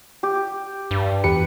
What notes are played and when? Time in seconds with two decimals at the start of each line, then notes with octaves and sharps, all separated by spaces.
0.23 G4
0.91 G2
1.24 E2 G4 B4 C#7